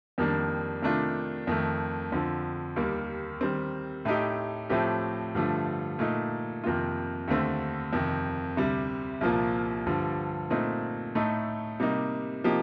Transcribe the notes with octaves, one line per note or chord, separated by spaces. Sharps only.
F2 D#3 G3 A#3 D4
C3 D#3 A3 D4 F4
F2 D#3 A3
F2 D3 F3
D#2 D#3 G3 A#3
D#3 G3 C4
A2 A3 D#4 G4
A2 F3 A3 C4 G4
G2 D3 F3 A3
A#2 A3 D#4
F2 C3 D#3 A#3 F4
D#2 D3 A3 C4
F2 C3 D#3
D2 C3 G3
C2 A#2 F3 A#3
G2 D3 F3
A#2 A3 C4 D#4
A2 A3 D#4 A4
C3 G3 A#3 D#4
C3 F3 A#3 D#4 G4